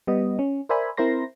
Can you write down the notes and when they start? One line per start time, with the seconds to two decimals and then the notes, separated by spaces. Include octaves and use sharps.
0.07 G3 B3 D#5
0.39 C#4
0.69 A#4 C5 D5 E5 G#5 B5
0.97 C4 E4 A#4 C5 C6 A#6